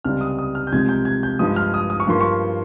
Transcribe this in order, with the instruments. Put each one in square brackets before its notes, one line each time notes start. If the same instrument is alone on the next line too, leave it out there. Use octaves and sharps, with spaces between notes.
[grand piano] C#2 C3 G3 F6
D#6
D#6
F6
G6
C2 C3 F3 G#3 G#6
G6
G#6
G6
G2 F3 G#3 D#6
F6
D#6
D#6
C#6
G2 F3 A#3 C6
C#6